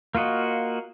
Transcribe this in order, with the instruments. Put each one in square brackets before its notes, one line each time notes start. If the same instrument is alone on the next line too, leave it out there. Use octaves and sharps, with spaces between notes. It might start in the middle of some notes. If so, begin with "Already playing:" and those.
[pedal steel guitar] A#3 F4 F#4 D#5